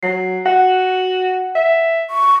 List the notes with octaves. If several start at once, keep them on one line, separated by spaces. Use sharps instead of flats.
F#3 C7
F#4 F#5
E5
C#6